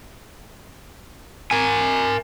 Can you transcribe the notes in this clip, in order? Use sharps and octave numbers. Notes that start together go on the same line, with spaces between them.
A#4 G#5